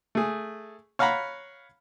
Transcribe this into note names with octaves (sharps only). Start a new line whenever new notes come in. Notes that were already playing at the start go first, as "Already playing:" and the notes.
A3 G#4
C#5 F5 F#5 A#5 B5